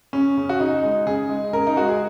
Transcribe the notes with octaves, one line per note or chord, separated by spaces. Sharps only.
C#3 C#4
C#3
F#4
C#3 D#4
G#3
C#3 G#4
G#3
C#3 A#4
D#4
G#3 F#4
G#4